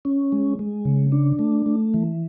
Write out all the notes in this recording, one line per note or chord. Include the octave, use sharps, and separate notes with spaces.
C#4
G#3
G#3
C#3
D4
A3
A3
E3